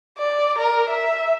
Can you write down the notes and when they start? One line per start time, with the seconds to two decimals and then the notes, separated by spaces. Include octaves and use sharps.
0.18 D5
0.58 A#4
0.90 E5